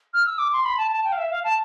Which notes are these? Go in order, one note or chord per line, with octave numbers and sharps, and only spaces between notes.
F6
E6
D6
C6
B5
A5
A5
G5
F5
E5
F5
A5